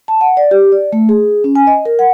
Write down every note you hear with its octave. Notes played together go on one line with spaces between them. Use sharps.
A5
F#5
D5
G4
D5
A3
G#4
C#4
G#5
D#5
A#4
F#5